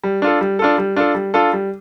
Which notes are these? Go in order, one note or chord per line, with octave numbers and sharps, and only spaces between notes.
G3
D4 F4 A4
G3
D4 F4 A4
G3
D4 F4 A4
G3
D4 F4 A4
G3